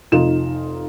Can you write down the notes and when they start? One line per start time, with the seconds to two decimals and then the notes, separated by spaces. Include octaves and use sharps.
0.12 F1 D#4 F4 E7